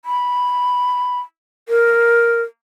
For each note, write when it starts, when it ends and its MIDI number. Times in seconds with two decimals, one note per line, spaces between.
0.05 1.20 83
1.69 2.42 70